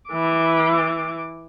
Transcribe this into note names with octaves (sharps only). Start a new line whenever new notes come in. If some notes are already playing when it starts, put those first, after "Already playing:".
E3 D6